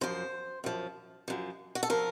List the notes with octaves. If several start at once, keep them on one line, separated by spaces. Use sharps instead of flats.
F#2 F3 C5
F#2 F3
F#2 F3
F#4
A4
F3 A#4